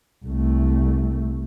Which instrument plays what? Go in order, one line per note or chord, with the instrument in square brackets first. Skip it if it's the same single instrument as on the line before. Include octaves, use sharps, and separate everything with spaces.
[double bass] C2 A3